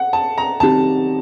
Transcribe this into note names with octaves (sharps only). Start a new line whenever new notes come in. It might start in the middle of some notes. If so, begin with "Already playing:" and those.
Already playing: F#5
A5
A#5
D#3 F#3 C4 D#4 G4 A5